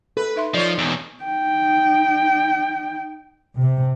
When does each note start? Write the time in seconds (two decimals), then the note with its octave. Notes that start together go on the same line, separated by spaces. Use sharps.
0.17 A4 B4
0.36 D#4 E5 C6
0.54 F3 D#4 C#5 D5
0.78 E2 B2
1.24 D#4 G5
3.57 C3